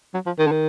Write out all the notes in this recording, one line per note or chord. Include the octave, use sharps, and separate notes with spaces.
F#3
F3
D#3
D3
D#3